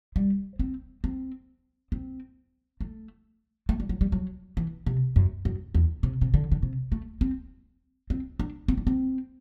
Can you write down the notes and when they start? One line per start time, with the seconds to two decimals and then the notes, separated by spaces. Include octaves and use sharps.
0.16 G3
0.59 C4
1.04 C4
1.92 C4
2.81 A3
3.69 A3
3.80 G3
3.89 F#3
4.01 G3
4.12 F#3
4.57 E3
4.86 C3
5.16 F#2
5.45 F#2
5.75 E2
6.03 C3
6.21 C3
6.34 D3
6.52 D3
6.62 C3
6.92 A3
7.21 C4
8.10 C4
8.39 D4
8.68 C4
8.77 D4
8.87 C4